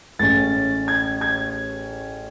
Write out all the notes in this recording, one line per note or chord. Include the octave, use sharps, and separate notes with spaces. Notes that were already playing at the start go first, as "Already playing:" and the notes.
A1 A2 G#3 C#4 A6
G#6
G#6